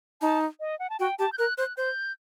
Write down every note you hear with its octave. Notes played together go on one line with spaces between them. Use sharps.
D#4 A5
D#5
F#5
A5
F#4 G5
G4 A5
G6
A#4 F#6
C5 F#6
C5 G6